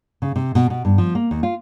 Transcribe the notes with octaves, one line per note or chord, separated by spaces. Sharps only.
C#3
C3
B2
B2
G2
F3
A#3
D#2
F4